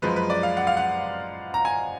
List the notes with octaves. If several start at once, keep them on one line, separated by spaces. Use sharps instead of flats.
F#2 F3 G#3 B4
B4
D5
F5
F#5
F5
F#5
A#5
G#5